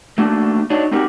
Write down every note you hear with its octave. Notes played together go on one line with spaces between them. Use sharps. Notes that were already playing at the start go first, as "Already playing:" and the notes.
A3 A#3 D4 F#4
D4 D#4 F#4 C#5 D#5
C4 D#4 F#4 G4 A#4